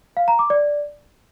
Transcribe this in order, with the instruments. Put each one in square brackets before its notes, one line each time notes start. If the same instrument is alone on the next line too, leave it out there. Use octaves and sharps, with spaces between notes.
[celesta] F5
A#5
D6
D5